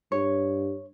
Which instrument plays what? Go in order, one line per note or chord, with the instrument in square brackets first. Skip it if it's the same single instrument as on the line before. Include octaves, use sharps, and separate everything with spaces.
[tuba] G2 [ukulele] C#5